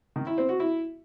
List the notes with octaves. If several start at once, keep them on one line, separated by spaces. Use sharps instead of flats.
D#3
E4
C4
F#4
E4